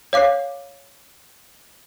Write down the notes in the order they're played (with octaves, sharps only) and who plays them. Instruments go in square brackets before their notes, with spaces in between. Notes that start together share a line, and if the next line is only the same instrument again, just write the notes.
[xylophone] C#5 F5 D6 F#6 C7